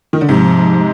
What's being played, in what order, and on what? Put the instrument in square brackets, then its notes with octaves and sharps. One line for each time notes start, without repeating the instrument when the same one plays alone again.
[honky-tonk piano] D#3
D3
[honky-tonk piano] G#2 C3 [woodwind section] F3
[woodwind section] G#3
G#3